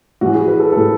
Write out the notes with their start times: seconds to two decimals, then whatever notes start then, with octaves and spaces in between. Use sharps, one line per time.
0.21 A2 E3 F#4
0.35 G#4
0.48 B4
0.60 A4
0.72 A2 E3 A4